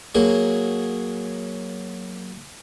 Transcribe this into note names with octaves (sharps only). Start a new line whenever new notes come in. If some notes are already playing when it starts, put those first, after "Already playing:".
F#3 A#3 G#4